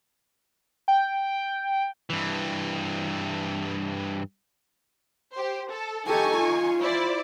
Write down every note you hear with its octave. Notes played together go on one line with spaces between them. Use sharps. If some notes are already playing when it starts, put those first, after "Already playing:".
G5
G2 E3
G4 C5
A4
D#4 G4 A4 G#5 C#6
F4
E4 C5 D5